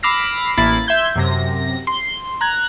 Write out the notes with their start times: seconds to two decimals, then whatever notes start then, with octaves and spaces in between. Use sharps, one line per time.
0.03 B5 D6 E6 F6 A#6 C7
0.58 A1 A#3 E4 B5 A6
0.87 E5 C6 G6 G#6
1.16 F#2 C3 A#6
1.87 C6
2.41 A#5 F#6 G#6